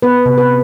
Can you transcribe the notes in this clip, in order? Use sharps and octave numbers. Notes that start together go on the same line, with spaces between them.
B3 B4
C3
B4